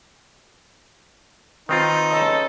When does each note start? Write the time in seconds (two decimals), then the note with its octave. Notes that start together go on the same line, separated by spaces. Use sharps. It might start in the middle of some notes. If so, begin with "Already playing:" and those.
1.69 D#3 C4 D#4 F4 B4 G5 C6
2.10 C#3 A4 D#5